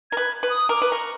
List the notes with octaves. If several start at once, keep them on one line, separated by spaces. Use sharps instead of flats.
A#4 G#6
B4
B4
D#6
A#4 D6
B4
A#4 C#6